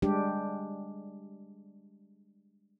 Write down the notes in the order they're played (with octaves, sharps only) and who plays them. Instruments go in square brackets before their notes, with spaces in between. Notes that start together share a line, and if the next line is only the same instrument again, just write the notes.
[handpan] G3 G#3 D4 G4